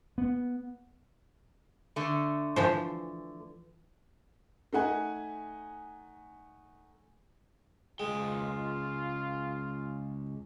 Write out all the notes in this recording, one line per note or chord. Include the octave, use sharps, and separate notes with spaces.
B3
D3 A3
E3 F3 C5
A3 D#4 F#5 G#5
C#2 G#3 F4 G5